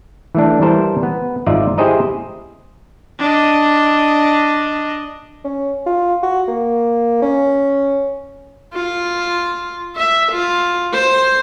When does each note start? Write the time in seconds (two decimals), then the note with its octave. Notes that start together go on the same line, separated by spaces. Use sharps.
0.35 E3 A3 D4
0.61 E3 G3 A#4 C5 A5
1.03 B3
1.46 G#1 D#4 F4 D5 E5
1.78 E4 G4 G#4 C5 D#5 A#5
3.19 D4 D#5
5.45 C#4
5.86 F4
6.23 F#4
6.48 A#3
7.22 C#4
8.74 F4
9.96 E5
10.32 F4
10.93 C5